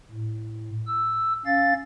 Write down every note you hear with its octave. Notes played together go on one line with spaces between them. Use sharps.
A2
E6
C#4 F5 A6